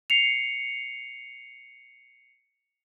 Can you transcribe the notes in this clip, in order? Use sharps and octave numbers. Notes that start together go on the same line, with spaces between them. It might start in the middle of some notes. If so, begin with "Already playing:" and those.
C7 C#7 F7